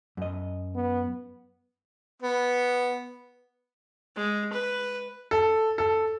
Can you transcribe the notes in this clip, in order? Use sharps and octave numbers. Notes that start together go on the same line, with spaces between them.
F#2 D#5
B3
B3
G#3
B4
A4
A4